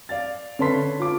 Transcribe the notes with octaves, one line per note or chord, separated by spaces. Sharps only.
D5 F5 A6
D3 C#4 B4 A5 C6 B6
F4 D6